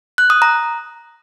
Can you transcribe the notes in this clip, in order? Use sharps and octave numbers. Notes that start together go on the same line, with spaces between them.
F#6
D#6
A#5